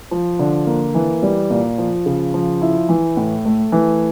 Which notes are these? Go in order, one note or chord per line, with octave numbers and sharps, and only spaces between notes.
F3
D3
A#3
E3
G3
A#2
F3
C#3
F3
E4
E3
A2
A3
E3